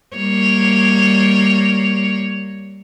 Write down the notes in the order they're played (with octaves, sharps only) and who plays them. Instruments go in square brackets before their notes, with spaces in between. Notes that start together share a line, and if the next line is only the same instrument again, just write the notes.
[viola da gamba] G3 A#3 C#5